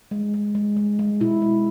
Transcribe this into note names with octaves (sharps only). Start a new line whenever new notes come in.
G#3
G#3
G#3
G#3
G#3
B2 E4
G#3